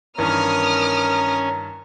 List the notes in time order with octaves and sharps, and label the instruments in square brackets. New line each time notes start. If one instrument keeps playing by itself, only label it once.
[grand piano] G2 D#3 E3 [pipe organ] C#4 [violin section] A#4 D#6 F6 [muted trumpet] A#5